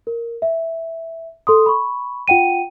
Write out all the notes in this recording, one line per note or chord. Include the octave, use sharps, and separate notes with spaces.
A#4
E5
A4 C6 D#6
B5 C#6
F4 F#5 G5 D#7